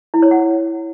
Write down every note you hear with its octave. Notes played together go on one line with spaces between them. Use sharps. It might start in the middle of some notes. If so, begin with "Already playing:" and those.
E4
C#5
F#5